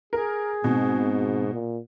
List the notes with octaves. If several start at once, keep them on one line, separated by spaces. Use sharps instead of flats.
G#4 A#4
G#2 B2 C4
A#2